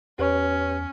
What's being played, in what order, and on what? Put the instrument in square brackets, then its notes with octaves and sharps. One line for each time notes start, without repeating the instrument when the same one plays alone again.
[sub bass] E2 [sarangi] C#4 [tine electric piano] G4 B4 C#5